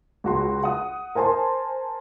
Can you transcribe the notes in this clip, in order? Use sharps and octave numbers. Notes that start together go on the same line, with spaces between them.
C#2 F#4 C6
F#5 D#6
A#4 C5 G#5 A5 C6